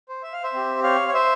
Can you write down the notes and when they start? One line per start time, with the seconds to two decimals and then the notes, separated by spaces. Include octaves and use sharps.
0.09 C5
0.23 E5
0.33 F5
0.43 C5 E5
0.53 C4 G4
0.83 C#5 F5
1.08 C#5
1.14 C5 E5